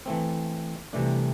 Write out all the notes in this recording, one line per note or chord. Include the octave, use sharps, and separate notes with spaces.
E3 A3 C4
C2 C3 E3 A3 D4